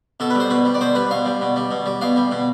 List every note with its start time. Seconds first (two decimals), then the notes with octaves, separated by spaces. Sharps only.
0.20 B2 A4
0.30 B4
0.35 G3
0.40 C5
0.50 B2 B4
0.65 G3
0.74 D5
0.81 B2 C5
0.95 G3 B4
1.11 B2 F5
1.26 G3
1.41 B2
1.56 G3
1.71 B2
1.86 G3
2.01 B2 F5
2.16 G3
2.32 B2